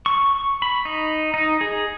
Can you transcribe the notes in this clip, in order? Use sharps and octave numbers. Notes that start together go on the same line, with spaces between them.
C#6
B5
D#4
D#4
G#4